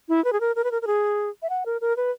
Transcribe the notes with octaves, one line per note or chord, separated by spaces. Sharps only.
E4
B4
G#4
A#4
A#4
B4
A#4
A#4
G#4
E5
F#5
A#4
A#4
B4